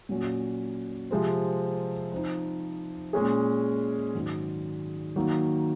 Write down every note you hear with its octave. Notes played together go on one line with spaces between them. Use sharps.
A#2 F#3 C#4 F#4
C3 F3 G#3 C4
F3 C4 D#4
A#2 G#3 C#4 G#4
G#2 D#3 F#3
D#3 F#3 A#3